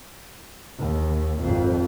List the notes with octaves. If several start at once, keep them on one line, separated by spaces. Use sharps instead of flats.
D#2
G#1 F2